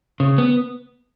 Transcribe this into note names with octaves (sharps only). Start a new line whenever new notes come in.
C#3
B3